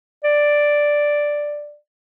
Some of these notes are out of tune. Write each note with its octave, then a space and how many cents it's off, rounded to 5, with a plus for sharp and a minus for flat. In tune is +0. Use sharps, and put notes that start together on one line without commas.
D5 +0